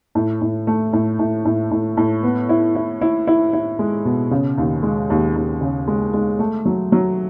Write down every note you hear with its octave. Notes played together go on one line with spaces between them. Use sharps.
A2
A2
A3
A2
A2
A2
A2
A2
B3
E4
E4
E4
E4
E4
G#3
B2
C#3
D#2
G#3
D#2
D#2
C#3
G#3
G#3
A3
F#3
F#3